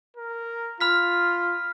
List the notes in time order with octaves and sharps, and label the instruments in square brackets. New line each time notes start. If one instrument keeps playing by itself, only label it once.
[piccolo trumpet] A#4
[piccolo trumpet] F4 [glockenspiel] B5 F6 B6